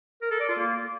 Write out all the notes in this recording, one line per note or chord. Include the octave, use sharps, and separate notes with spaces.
A#4
A4
D5
F4
A#3